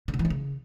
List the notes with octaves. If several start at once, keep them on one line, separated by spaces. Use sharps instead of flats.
C#3
B3
E3
E4
C#3